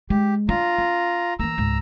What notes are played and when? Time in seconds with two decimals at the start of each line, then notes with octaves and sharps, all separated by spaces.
0.10 G#3 G4
0.49 D4 F4 A#5
0.78 C#4
1.39 E3 A#3 A#5 E6
1.58 C#2 G#2